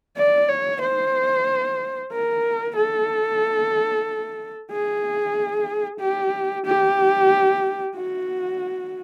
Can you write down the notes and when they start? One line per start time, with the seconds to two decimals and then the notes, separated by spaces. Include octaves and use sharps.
0.17 D5
0.49 C#5
0.81 C5
2.12 A#4
2.76 A4
4.71 G#4
6.00 G4
6.66 G4
7.95 F#4